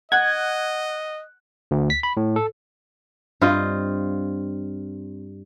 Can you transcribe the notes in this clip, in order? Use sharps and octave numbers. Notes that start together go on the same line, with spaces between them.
D#5 F#5 F#6 G#6
D2
B6
B5
A2
A4
G2 C4 F4 D#5